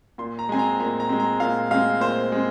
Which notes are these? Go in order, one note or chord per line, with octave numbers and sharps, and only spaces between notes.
A#2 C6
A#5
G#3 C4 G#5
A#5
A#2 A#5
A#5
G#3 C4
A#5
A#2 F5
G#3 C4 F5
A#2 C5
G#3 C4